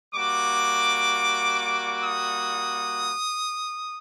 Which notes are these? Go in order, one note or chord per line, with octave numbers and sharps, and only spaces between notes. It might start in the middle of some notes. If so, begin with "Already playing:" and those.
G3 A#3 F#4 D6
D#6